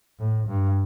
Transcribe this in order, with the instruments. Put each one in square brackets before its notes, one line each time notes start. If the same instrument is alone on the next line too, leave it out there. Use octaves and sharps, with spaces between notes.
[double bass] A2
G2